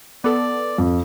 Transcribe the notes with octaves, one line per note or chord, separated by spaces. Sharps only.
B3 A4 D5
F2